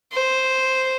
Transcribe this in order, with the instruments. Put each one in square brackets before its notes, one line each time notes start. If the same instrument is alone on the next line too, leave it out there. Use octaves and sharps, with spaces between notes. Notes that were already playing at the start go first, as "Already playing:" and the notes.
[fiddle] C5